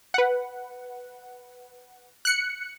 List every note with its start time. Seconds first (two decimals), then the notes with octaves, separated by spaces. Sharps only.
0.14 B4 F#5
2.25 F#6 C#7